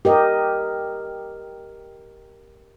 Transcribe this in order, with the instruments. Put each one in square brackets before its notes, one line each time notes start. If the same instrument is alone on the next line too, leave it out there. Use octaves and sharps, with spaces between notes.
[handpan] G4 A#4 D#5